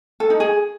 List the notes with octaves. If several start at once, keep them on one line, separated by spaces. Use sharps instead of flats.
A4
D#4
G#4